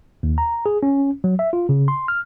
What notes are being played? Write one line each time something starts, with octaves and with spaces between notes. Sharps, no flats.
D#2
A#5
G#4
C#4
F#3
E5
F4
C#3
C6
F6